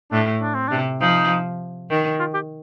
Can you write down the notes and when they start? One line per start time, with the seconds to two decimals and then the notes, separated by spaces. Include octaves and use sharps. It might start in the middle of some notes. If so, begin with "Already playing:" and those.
0.11 A2 D4
0.41 D4
0.55 C4
0.68 C3 D4
1.01 F3 D#4
1.90 D#3
2.19 F4
2.34 G4